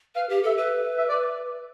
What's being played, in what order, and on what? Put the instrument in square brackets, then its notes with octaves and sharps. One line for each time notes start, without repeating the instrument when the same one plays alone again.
[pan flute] B4 [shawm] F5
[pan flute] G4
[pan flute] A4 [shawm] E5
[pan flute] B4 [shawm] E5
[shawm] E5
D5